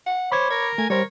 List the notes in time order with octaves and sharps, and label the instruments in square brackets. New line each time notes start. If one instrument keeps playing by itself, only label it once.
[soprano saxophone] F#5
[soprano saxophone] C5 [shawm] C#5 [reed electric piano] B5 D6 G#6
[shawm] A#4 [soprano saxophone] C#5
[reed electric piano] A3 [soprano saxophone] G#5
[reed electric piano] G3 C5 [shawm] A#4 [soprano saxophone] C#5